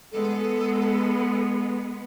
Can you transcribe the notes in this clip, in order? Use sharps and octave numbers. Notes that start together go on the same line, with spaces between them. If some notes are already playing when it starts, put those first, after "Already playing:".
G#3 B3 A4